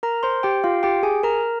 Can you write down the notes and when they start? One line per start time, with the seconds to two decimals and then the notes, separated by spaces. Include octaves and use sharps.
0.03 A#4 A#5
0.23 C5 C6
0.43 G4 G5
0.64 F4 F5
0.83 G4 G5
1.03 G#4 G#5
1.23 A#4 A#5